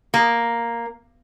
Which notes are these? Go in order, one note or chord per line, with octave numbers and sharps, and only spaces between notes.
A#3